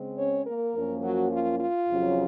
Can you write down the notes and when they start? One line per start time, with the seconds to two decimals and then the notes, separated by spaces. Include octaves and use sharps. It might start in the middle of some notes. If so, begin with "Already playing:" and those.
Already playing: C#3 G#3 C4
0.18 C#4 C#5
0.46 A#3 A#4
0.76 F#2 F3 A#3 C#4
1.03 F#3 F#4
1.32 F4
1.60 F4
1.89 F2 C#3 F#3 C#4